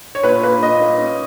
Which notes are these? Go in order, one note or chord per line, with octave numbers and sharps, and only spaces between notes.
C#5
A#2 B4
A#3 B4
A#3 D#5
A#3
C#4